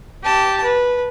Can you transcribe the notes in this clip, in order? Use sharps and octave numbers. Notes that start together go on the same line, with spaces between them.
G4 A5
B4